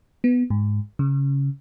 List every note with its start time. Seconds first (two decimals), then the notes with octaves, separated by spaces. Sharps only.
0.24 B3
0.50 G#2
0.99 C#3